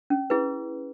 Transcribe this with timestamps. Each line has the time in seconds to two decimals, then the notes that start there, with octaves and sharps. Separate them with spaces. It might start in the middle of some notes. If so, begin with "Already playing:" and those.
0.10 C#4
0.30 E4 G#4 B4